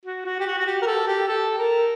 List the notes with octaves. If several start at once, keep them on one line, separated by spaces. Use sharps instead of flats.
F#4
F#4
G4
F#4
F#4
G4
A#4
A4
G4
A4
A#4